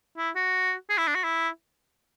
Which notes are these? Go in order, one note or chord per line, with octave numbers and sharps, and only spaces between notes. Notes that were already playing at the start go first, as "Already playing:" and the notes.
E4
F#4
G#4
E4
D4
F#4
E4